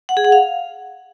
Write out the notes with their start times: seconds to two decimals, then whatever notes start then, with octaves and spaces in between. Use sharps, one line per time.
0.09 F#5
0.17 G#4
0.25 F#5
0.32 F5